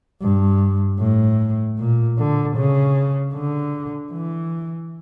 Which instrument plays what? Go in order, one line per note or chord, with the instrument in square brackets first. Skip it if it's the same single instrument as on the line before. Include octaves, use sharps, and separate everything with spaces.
[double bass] G2
A2
A#2
D3
C#3
D3
E3